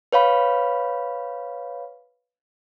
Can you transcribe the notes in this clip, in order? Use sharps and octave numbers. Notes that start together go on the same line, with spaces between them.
B4 C#5 F5 B5